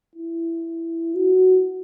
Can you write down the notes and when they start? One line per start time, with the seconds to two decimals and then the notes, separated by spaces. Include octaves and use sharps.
0.15 E4
1.15 F#4